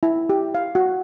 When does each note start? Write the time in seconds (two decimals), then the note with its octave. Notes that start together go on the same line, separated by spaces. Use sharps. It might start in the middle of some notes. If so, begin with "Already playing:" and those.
0.03 E4
0.30 G4
0.55 F5
0.75 F#4